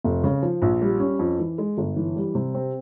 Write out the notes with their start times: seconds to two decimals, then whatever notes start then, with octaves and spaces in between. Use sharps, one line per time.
0.04 F1
0.24 C#3
0.43 F3
0.62 A#1
0.81 G3
1.00 C#4
1.19 F2
1.39 E3
1.58 G#3
1.78 G1
1.96 E3
2.16 G3
2.35 C3
2.54 C4